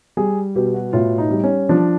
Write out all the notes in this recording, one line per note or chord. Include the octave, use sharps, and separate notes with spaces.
G3 G#4
B2 G4
F#4
A2 F4
D#4
G3
C#4
F3 D4